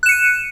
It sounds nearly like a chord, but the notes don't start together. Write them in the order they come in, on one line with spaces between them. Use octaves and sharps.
F#6 E7 C#7 D#7